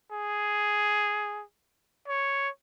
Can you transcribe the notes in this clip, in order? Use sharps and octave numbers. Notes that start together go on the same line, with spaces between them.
G#4
C#5